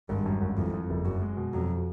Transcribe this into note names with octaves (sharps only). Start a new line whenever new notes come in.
G#1 G2
F#2
G#1
F2 E3
F2
F#1
F#2 F#4
G#3
B2
F2 F#3